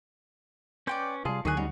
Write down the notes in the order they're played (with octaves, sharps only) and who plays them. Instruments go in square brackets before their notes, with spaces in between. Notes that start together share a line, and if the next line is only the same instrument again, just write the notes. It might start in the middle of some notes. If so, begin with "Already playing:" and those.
[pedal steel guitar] C#4 B4 G6 [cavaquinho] D5 G5 C6
[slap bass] C3 G3 [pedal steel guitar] F4 G#4 [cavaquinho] A5
[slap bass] D2 D3 F#3 [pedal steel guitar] D#3 G#4 F#6 [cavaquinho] G#5 C#6
[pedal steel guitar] G3 C#4 D#4 [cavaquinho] F#4